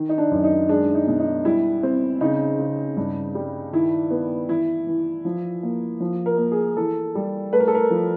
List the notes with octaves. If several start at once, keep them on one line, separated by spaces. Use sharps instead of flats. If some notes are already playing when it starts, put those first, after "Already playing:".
Already playing: D#3
D#4
D4
F#2
D#4
G#3 D4
D#4
B2
D#4
G3 E4
C4
C#3 D#4
C#3
G2
G3
D#3 E4
B3
E3 E4
E3
F3
A#3
F3
A#4
A#3
G#4
E3 A4
G3
A3 B4
A#4
A4
A#4
F3